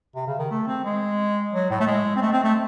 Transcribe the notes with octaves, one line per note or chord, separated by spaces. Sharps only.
C3
C#3
D#3
A3
C4
G#3
F#3
A2
A3
G#3
C4
A3
C4
A3